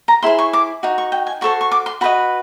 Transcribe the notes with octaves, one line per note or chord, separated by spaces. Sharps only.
A#5
E4 G#4 C5 C6
C#6
D6
D#4 F#4
C#6
G5
G#5
F#4 A4 C5 C#6
C#6
D6
C6
F#4 B4 D#5 B5